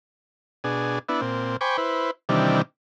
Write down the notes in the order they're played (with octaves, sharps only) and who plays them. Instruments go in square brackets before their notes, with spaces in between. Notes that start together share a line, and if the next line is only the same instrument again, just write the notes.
[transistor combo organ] B2 D4 G#4
B3 D4 E4
A#2 C4
C5 G5 G#5 B5 C#6 D6
E4 B4 C5
C3 D#3 E3 G3 D4